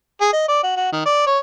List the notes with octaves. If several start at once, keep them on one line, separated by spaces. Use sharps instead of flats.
G#4
D#5
D5
F#4
F#4
D#3
D5
C#5